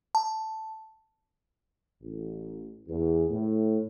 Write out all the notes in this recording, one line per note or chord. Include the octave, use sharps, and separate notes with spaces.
A5
A1
E2
A2